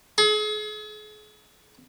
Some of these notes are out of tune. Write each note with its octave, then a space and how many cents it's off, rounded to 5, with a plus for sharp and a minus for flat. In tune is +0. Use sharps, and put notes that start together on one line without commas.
G#4 +40